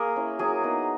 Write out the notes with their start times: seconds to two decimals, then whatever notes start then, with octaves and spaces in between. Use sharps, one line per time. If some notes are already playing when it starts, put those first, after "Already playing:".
Already playing: A#3 G#4 A#4
0.16 C#4 E4
0.39 F#3 G#4
0.62 B3 D#4